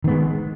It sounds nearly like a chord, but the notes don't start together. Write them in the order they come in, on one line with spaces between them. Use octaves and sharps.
D#3 B3 G#3